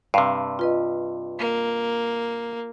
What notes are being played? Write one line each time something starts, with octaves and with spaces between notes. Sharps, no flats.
G2 C3 F5
F4 B4 D#5
A#3